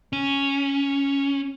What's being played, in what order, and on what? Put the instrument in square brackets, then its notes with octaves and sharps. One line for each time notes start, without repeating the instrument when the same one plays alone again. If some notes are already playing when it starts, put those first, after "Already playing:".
[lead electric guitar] C#4